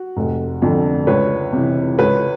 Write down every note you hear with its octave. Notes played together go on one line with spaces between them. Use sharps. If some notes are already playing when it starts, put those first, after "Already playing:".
Already playing: F#4
F1
F2 D3
C#2 B4 C#5
C3 E3
C#2 B4 C#5